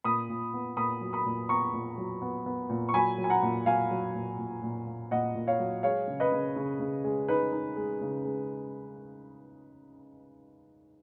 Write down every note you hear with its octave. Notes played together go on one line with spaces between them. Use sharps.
A#2 B5 D#6
A#2
B3
A#2 B5 D#6
F#3
B5 D#6
A#2
B3 A#5 C#6
A#2
F#3
B3
B3
A#2
C#6
F#3 G#5 B5
F#3
G#5
F#5 A#5
A#2
F#3 F5 G#5
F#3
A#2
A#2
A#2
A#3
A#2 D#5 F#5
A#2
C#5 F5
F#3
G#3 C#5 F5
C#3
B4 D#5
C#3
C#3
C#3
G#3
D#4 B4
D#4
G#3
C#3
G#3